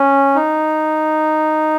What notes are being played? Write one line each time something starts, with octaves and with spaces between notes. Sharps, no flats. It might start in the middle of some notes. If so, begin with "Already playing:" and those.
Already playing: C#4
D#4